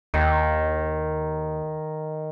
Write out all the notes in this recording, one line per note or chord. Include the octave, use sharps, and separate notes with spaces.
D#2 D#3